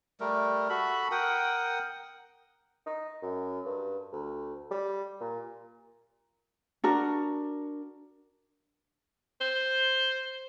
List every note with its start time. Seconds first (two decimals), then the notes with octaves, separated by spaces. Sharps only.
0.20 G3 A3 A#4
0.69 F#4 A4 B5
1.11 A#4 F#5 G5 D#6
2.86 D#4
3.22 F#2
3.65 G2
4.12 D2
4.71 G3
5.20 A#2
6.84 D4 F#4 A#4
9.41 C5